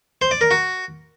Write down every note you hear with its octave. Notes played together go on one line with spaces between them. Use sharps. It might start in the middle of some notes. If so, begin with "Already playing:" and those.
C5
D5
A#4
F#4